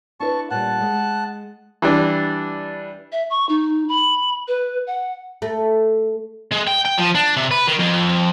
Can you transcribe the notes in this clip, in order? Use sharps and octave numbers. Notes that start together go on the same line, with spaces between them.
D4 E4 B4 A5 C#6
A#2 G3 F#5 A5
G#3
E3 G3 D4
E5
C#6
D#4
B5
B4
F#5
A3
G#3
G5
G5
F3
D4
C3
B4
D#3
F2